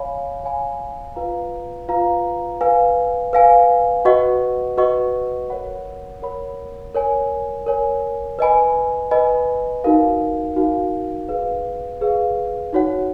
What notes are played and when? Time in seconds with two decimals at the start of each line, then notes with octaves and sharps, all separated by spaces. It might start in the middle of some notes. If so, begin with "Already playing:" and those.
Already playing: C#5 F5 G#5 B5
0.44 C#5 F5 G#5 B5
1.16 F4 B4 F5 A#5
1.89 F4 B4 F5 A#5
2.61 B4 F5 G#5
3.33 B4 F5 G#5
4.05 F#4 B4 D#5 F#5 C#6
4.77 F#4 B4 D#5 F#5 C#6
5.50 A#4 C#5 F#5 B5
6.22 A#4 C#5 F#5 B5
6.95 A#4 C#5 G#5
7.66 A#4 C#5 G#5
8.39 B4 D#5 G#5 B5
9.11 B4 D#5 G#5 B5
9.84 D#4 F#4 A#4 F5
10.56 D#4 F#4 A#4 F5
11.28 G#4 B4 F5
12.01 G#4 B4 F5
12.73 D#4 F#4 C#5 F#5